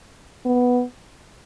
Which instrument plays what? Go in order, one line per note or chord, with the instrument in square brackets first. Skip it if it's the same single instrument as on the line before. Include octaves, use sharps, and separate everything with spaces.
[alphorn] B3